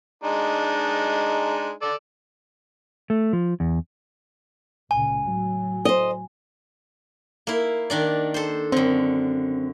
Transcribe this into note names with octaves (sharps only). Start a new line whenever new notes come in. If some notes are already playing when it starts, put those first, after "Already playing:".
G#3 D4 D#4
A4 D5
A3
F3
E2
C#2 A#2 C#3 G#5
A2 F#3
C5 D#5
A#3 E4
D#3 D4 D5
A4 C5
F#2 D3 C4